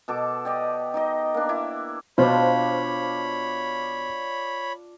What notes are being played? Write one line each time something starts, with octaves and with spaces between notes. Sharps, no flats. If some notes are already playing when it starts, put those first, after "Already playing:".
B2 A4 A5 D6
G4 D5 D#5
D#4 D5 D#5
A#3 D4
E4
B2 D4 F4 C5 C#5 B5